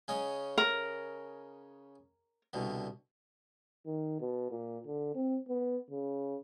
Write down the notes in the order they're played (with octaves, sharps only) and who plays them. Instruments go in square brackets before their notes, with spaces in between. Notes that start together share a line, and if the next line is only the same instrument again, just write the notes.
[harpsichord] C#3 C#4 D#5
[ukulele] A#4
[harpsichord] C2 B2 D3
[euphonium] D#3
B2
A#2
D3
C4
B3
C#3